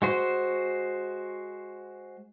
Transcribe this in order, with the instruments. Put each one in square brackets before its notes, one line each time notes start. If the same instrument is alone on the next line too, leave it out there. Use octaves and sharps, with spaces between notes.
[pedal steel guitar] G#3 F#4 C5